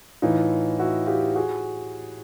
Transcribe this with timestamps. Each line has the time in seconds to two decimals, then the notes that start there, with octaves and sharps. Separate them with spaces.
0.22 A2 E3 D#4 F4
0.79 E4 F#4
1.07 F4 G4
1.35 F#4 G#4